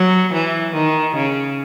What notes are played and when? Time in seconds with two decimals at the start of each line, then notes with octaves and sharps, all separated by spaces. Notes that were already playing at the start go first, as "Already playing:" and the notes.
Already playing: F#3
0.33 E3
0.74 D#3
1.15 C#3